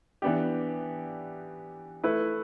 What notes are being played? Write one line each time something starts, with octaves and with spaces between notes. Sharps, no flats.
E3 B3 D4 G4
A3 E4 B4